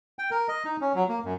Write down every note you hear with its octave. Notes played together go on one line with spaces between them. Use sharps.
G5
A#4
D#5
D#4
C#4
F#3
A#3
F#2